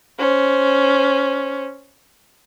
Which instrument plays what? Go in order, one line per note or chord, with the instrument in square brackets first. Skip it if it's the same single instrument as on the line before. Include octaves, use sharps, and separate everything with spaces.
[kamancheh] C#4 C5